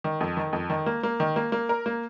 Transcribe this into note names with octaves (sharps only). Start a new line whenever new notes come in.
D#3
F2
D#3
F2
D#3
A#3
A#3
D#3
A#3
A#3
A#4
A#3